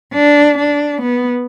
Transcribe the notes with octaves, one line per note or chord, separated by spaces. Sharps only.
D4
D4
B3